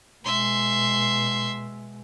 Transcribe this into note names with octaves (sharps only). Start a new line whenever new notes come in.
B2 G#3 E5 C6